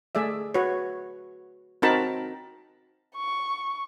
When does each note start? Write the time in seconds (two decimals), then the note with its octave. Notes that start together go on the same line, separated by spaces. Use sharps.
0.15 A3 G#4 D5 E5
0.54 F#4 B4 C#5
1.82 C4 D#4 F#4 A#4 A5 B5
3.16 C#6